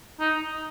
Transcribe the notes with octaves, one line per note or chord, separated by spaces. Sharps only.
D#4